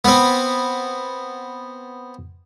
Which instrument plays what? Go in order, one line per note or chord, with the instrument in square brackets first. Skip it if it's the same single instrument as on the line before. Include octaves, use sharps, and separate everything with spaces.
[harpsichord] B3 C4